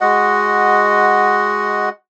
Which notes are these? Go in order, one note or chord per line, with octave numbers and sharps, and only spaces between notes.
G#3 F#4 D#5 F#5